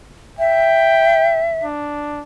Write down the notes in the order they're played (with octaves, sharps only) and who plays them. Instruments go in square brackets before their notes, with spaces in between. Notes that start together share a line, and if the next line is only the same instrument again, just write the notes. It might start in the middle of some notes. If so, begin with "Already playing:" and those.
[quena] E5 [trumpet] G5
[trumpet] D4